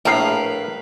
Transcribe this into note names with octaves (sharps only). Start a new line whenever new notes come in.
A#1 A2 A#4 B4 F5